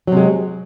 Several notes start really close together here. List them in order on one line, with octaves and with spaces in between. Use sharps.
F#3 C3 G#3